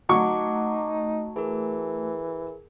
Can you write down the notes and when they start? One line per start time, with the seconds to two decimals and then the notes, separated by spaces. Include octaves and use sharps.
0.09 F#3 A3 D#4 F#5 C#6 D6
1.36 E3 G#4 A#4